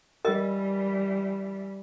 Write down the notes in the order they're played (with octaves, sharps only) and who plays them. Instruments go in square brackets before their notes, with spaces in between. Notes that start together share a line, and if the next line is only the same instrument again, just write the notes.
[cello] E3 G3 [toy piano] A#4 D#5